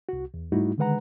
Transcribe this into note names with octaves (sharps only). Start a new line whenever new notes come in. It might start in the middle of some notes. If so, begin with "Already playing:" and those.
C2 F#4
E2
G#2 G3 A3 D#4 E4 F#4
D3 D#3 G#3 B4 F#5 A#5